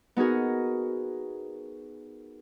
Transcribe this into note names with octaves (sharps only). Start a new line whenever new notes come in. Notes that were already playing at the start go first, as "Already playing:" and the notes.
B3 D#4 F#4 G#4 A#4